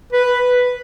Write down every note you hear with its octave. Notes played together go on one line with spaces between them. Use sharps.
B4